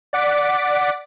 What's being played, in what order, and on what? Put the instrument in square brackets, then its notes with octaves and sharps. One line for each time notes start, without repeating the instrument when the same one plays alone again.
[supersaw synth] D5 F#5 D6 B6